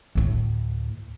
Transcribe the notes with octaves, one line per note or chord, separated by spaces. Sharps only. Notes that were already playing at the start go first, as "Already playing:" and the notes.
D2 A2